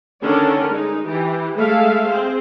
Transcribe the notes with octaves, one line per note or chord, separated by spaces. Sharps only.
D3 D#3 C#4 D4 A4 A#4
G#3 D#4
E3 G4
G#3 A3 A4 E5 F5
C4 G#4 C5